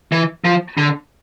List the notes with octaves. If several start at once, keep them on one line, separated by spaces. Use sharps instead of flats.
E3
F3
D3